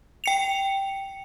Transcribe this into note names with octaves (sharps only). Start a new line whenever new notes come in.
G5 C#7 F7